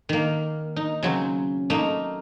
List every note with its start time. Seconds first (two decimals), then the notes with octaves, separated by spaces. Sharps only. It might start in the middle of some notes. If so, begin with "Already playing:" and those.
0.09 D#3 A#3
0.76 D#4
1.03 C#3 F#3 C4
1.70 A3 A#3 D#4